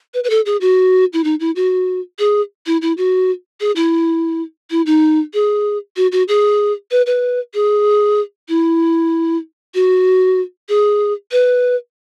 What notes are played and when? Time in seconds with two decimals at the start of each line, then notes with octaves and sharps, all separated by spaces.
0.14 B4
0.24 B4
0.30 A4
0.46 G#4
0.61 F#4
1.13 E4
1.24 D#4
1.40 E4
1.56 F#4
2.19 G#4
2.66 E4
2.82 E4
2.98 F#4
3.60 G#4
3.76 E4
4.71 E4
4.86 D#4
5.34 G#4
5.96 F#4
6.12 F#4
6.28 G#4
6.91 B4
7.06 B4
7.54 G#4
8.49 E4
9.75 F#4
10.69 G#4
11.32 B4